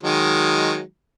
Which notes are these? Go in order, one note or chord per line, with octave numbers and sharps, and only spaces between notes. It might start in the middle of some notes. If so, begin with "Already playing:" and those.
D#3 F#3 G#3